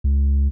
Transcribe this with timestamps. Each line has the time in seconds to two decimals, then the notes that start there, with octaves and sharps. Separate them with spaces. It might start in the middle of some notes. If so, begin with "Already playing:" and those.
0.04 C#2